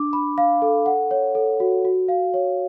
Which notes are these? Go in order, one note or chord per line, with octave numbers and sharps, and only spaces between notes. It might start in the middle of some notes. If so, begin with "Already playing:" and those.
Already playing: D4 D6
B5
F5
A4
F#5
C#5
A4
F#4
F#4
F5
C#5